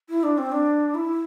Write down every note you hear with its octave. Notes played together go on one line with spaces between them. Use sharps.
E4
D4
C4
D4
E4